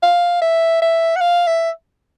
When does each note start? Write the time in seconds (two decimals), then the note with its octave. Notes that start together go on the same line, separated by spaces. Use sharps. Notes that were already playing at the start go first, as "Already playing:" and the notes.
0.03 F5
0.42 E5
0.82 E5
1.16 F#5
1.21 F5
1.47 E5